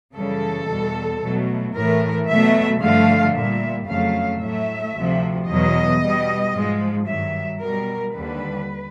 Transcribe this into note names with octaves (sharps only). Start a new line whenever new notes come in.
F#2 C#3 E3 G3 A4
E2 B2 G3
B2 F#3 A3
A2 E3 A3 A#4
B2 F#3 A3 E5
G2 D3 F3 A3 F5
A#2 G3 E5
F2 C#3 F#3 A3 F5
A2 F#3 A3 E5
D2 C3 F3
E2 B2 F#3 D#5
B2 G3
G#2 F3 G#3
G2 D#3 F#3 E5
B2 G3 A#4
D#2 D3 G3 B4